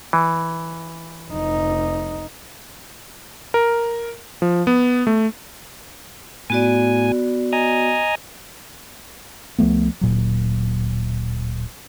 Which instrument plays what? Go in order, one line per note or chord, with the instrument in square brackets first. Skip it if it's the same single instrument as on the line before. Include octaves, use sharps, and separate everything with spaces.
[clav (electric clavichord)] E3
[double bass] F1 D#4
[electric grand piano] A#4
F3
B3
A3
[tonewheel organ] A2 G#5 [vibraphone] B3 F#4 D5
[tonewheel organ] D#5 G#5 A#5
[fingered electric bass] C#2 F3 A3 B3
D1 A#2 F#3